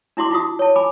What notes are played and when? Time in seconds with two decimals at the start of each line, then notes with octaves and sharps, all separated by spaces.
0.17 D4 E4 F#4 C6 D6
0.31 D#4 F4 F#4 D#6
0.59 C#5 A5
0.76 G#5 B5 D6